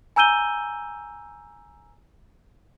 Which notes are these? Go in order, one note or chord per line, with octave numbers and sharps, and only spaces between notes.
G#5 A#5 E6 G6 D#7 G7